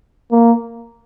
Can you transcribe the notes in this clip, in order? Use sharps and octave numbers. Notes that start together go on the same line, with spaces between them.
A#3